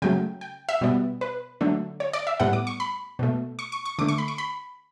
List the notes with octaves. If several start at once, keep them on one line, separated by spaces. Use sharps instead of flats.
C#3 F#3 A3 G5
G5
E5
B2 G3 B3
B4
D3 F#3 A3
C#5
D5
E5
A2 G3 B3 F#5
D6
C#6
B5
B2 A3
C#6
C#6
C#6
D3 A3 D6
C#6
B5
C#6
B5